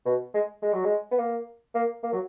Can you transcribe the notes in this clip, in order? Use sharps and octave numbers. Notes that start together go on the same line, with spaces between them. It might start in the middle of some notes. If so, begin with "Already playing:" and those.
B2
G#3
G#3
F#3
G#3
B3
A#3
A#3
A#3
F#3